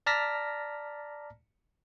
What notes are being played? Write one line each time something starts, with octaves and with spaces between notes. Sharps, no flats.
D5 A5 A#5 F6 A#6 B6